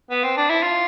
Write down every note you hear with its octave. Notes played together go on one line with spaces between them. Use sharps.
B3
C4
D4
E4
F4